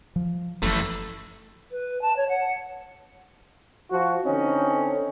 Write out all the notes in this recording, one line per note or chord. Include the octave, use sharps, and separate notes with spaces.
F3
F#1 E3 F3 A3
B4
A5
C#5
F#5
F3 F#4
D3 C4 C#4 D#4